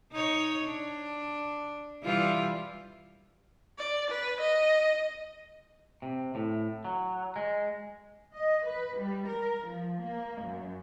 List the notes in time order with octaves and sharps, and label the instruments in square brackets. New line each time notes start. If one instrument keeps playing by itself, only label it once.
[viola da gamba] D#4 C#5
D4
E3 G3 F4
[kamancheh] D5
B4
D#5
[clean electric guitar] C3
A2
F#3
G#3
[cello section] D#5
B4
G3
A#4
F3
A#3
F#2